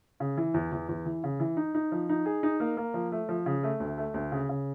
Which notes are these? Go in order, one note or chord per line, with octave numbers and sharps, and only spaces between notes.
C#3
E3
E2
E2
E2
E3
C#3
E3
D#4
D#4
F3
D#4
G#4
D#4
A#3
A#3
F3
A3
F3
C#3
A3
D2
A3
D2
C#3
C#3